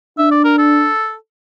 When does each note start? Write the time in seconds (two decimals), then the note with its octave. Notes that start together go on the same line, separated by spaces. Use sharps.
0.18 D4 E5
0.31 D5
0.44 A#4
0.58 A4